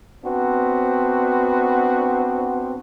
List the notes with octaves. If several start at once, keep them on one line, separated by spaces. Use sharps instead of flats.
B3 C4 D4 F#4